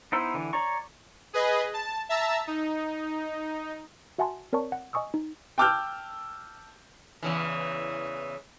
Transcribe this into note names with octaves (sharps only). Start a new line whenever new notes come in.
B3 D#4 E4 C5 E6
D3 E3
C#5 D5 A#5 C#6
G#4 B4 D#5
A5
E5 A5 A#5 E6
D#4
F#4 E5 F#5 G#5 A5 C6
C4 A#4 C#5 D5 A5 C#6
F#5
D#5 G#5 C#6 D#6 E6
D#4
G5 A5 D6 E6 F6 G6
E2 C#3 E3